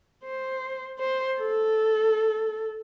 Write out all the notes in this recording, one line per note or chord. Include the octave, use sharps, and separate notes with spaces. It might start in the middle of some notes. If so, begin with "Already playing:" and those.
C5
C5
A4